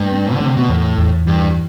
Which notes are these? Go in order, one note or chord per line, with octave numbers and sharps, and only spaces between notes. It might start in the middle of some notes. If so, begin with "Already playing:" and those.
Already playing: G2 A3
C4
D3
A3
C3
B2
E2 A2
E2
G2 E3